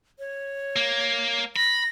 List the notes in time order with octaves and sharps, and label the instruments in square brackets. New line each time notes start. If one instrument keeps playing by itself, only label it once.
[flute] C#5
[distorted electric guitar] A#3
[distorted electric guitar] B5 [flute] A#6